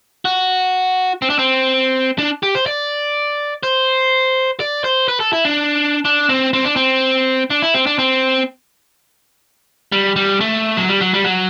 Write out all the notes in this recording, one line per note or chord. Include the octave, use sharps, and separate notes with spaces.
F#4
C4
D4
C4
D4
G4
C5
D5
C5
D5
C5
B4
A4
E4
D4
D4
C4
C4
D4
C4
D4
E4
C4
D4
C4
G3
G3
A3
F#3
G3
F#3
G3
F#3